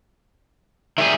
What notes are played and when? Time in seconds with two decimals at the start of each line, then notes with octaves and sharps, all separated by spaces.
0.98 D#3 G3 G#4 E5